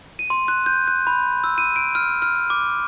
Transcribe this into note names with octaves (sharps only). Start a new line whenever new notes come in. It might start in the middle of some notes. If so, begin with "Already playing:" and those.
D#7
C6
F#6
G6
F#6
B5
E6
D#7
D7
F6
F6
D6